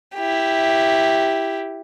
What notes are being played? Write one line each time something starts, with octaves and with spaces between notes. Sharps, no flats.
E4 G4